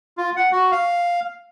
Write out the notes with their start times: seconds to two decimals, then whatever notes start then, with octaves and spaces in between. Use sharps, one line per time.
0.18 F4
0.37 F#5
0.52 F#4
0.71 F5